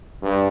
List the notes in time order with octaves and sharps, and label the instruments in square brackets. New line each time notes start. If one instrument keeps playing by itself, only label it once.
[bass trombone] G2